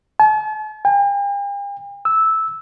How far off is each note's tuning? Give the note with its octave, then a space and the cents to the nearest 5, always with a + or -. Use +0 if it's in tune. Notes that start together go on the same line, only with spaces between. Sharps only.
A5 -45
G5 +45
E6 -10